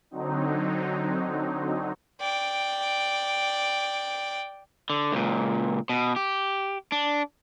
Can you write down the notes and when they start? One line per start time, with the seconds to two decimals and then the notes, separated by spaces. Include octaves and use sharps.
0.11 D3 F#3 C4 D#4
2.21 D5 G5
4.90 D3
5.12 C#2 A#2
5.89 B2
6.16 G4
6.92 D4